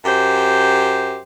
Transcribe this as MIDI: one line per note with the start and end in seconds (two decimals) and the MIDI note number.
0.04 1.17 42
0.04 1.17 67
0.04 1.17 72